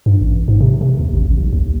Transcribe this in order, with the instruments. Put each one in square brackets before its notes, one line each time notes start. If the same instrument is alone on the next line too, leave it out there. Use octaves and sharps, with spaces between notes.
[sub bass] G2
A1
G#2
C3
C3
D#2
A1
A1
B1
D#2